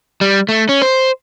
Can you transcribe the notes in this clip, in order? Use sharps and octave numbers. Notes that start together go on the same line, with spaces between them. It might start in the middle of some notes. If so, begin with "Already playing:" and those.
G3
A3
C#4
C5